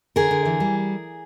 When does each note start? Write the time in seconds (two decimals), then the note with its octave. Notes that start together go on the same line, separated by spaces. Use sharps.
0.16 D3 G#4 A#4
0.31 D3
0.45 E3
0.60 G3